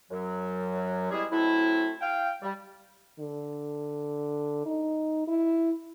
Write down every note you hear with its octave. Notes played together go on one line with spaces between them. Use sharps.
F#2 F#3
G3 G#3 C4 E4 G#4
F#3 A3 C4 E4
F5 G5
G3
D3
D#4
E4